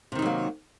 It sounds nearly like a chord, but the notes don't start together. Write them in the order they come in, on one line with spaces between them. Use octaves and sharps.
C3 D#3 D#4 F#3 A#3